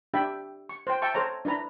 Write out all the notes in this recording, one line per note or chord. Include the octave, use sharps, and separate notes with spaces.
D4 G4 E5 G5 B5
C#6
C5 G5
E5 G5 A5 C#6
A4 C5 C#5 A#5
D4 E4 B4 A#5 B5